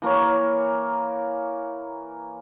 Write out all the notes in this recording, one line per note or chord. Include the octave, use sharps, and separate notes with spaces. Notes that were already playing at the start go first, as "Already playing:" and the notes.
E3 A#3 A#4 C#5